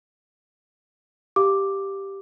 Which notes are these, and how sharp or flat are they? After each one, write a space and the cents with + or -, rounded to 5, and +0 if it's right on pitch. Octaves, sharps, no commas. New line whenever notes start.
G4 +0 F5 +0 D6 +0